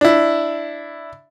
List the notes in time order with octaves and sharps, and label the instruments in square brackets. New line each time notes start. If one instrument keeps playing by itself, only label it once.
[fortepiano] D4 E4